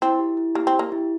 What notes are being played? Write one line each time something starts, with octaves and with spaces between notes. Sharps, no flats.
C4 E4
G4
E4
A#3 G4
C4
G4
A#3
E4